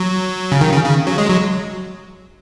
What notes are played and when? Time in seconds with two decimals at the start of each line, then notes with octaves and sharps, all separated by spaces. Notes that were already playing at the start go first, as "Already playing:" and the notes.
Already playing: F#3
0.52 C#3
0.61 D#3
0.72 C#3
0.85 C#3
1.07 F#3
1.18 G#3
1.29 F#3